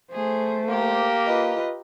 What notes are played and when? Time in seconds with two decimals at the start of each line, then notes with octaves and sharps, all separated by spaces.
0.12 A3 G#4 C5
0.69 A#3 G4 A#4
1.27 F4 B4 D#5